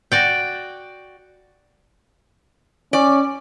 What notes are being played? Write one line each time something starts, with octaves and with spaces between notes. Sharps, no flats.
F#4 D5 G5
C#4 D5